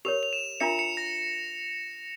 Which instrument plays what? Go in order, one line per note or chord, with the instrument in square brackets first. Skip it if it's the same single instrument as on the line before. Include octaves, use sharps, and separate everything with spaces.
[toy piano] G4 A#4 C#5 [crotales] F7
[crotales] F7
E7
[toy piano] D4 F4 A#4 E5 A#5 [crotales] C#7
[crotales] C#7
A#6